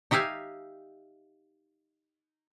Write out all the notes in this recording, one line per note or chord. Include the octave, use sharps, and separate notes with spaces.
D#4 G4 E5 F5 G#5